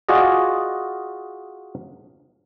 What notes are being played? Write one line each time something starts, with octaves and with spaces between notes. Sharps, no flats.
F4 F#4 G#4 D5 D#5